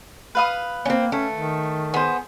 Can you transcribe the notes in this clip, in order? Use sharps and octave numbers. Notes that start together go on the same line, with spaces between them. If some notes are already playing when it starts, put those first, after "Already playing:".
B4 F5 D#6
A#3 C4 C#4
A3 C#4
D#3
B3 G#4 C5